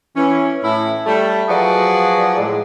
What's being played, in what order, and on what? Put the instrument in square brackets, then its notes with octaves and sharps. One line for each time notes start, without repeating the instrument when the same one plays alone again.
[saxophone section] E3 C#4
A2 E4
G3 A3 A4
F3 F#3 F#4 G#4 B4 D5
A2 G#3